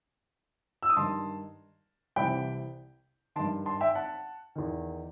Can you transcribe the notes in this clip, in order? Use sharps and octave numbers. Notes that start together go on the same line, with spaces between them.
E6
D#6
G2 D#3 A5 C6
C2 C3 E3 G5 B5
G2 D#3 A5 C6
A5 C6
E5 G5
F#5 A5
E2 D#3